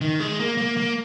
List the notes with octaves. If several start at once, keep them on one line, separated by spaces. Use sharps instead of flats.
D#3
G#3
A#3
A#3
A#3